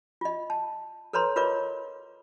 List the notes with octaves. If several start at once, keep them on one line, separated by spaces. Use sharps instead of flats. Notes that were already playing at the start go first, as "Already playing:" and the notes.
F4 D#5
A5
A4 B4 C#5 A#5 C6
F4 A#4 B4 C#5 D#5 D6